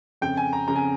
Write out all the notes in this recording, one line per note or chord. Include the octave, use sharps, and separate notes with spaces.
F2 C#3 G5
G#5
A#5
F2 C#3 A#5
G#5